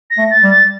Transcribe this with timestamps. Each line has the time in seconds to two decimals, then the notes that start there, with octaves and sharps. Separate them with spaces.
0.11 A#6
0.18 A3
0.31 A6
0.43 G3
0.50 A6